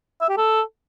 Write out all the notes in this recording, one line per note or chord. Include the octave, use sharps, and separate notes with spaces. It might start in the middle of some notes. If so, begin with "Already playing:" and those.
E5
G4
A4